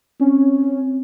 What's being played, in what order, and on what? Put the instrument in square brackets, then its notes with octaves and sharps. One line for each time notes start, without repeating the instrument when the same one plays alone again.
[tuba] C4 [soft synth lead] C#4